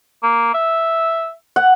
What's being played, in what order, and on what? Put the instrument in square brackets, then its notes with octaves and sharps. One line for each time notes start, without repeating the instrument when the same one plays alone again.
[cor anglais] A#3
E5
[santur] F#5